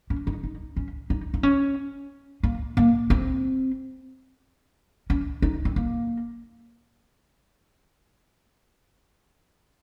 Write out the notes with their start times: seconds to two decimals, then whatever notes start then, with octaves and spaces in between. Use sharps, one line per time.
0.10 C#4
0.27 D#4
0.44 D#4
0.77 C#4
1.10 D#4
1.34 D#4
1.43 C#4
2.43 A#3
2.77 A#3
3.10 C4
5.10 C#4
5.42 D#4
5.65 C4
5.76 A#3